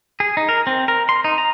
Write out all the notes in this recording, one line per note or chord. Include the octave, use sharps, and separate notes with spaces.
G#4
D#4
A#4
C4
A#4
C6
D#4
A#5